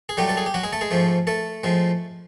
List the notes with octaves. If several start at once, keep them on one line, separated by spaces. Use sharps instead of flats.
G#4
A2 F#3 G3 A3 G4
A4
G#4
G4
F#3 F#4
G#3 G#4
A3 A4
G#3 G#4
G#2 F3 A3
A3 A4
A2 F3 G#3